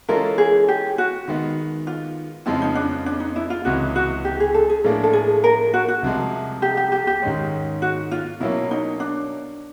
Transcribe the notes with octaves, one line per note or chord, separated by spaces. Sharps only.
E3 G#3 C#4 F4 A4 A#4
G#4
G4
F#4
D#3 G#3 B3
F4
F2 C#3 F3 G#3 B3 E4
D#4
D4
D4
D#4
E4
F4
C#2 C3 E3 G#3 F#4
F#4
G4
G#4
A4
G#4
A2 F3 A#3 D4
A4
G#4
A#4
F#4
F#4
C2 C3 F3 G#3
G4
G4
G4
G4
G#2 D#3 G#3 C#4
F#4
F4
B2 F#3 A#3 C#4 E4
D#4
D4